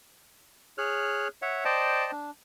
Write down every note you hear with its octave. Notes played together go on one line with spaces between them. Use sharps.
G#4 C#5 F6 F#6
C#5 E5 F#5
C5 D5 D#5 G5 A5
D4